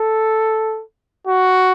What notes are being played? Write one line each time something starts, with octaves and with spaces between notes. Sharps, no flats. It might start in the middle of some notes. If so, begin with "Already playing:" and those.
Already playing: A4
F#4